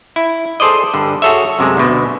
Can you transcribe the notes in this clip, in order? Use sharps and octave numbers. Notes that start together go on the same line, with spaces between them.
E4
G#4 A4 C5 D5 D#5
G2 D3
F#4 G#4 A4 C#5 E5
F#2 C3 G#3
D2 B2